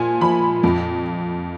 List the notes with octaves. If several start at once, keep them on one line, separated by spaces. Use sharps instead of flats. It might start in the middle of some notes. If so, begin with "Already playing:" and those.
Already playing: A#2 F3 G#5
F3 B5
F2